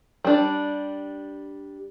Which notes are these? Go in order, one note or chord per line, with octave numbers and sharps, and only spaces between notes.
G3 D4